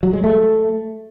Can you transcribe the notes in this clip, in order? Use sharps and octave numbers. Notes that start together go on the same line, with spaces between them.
F#3
G#3
A3